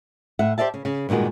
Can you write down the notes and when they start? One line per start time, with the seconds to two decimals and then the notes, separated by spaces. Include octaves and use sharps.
0.39 A2 E5 F#5
0.58 G4 C5 D5 E5 A5
0.74 C#3
0.85 C#3
1.09 G2 A#2 D#3 G#3 F#4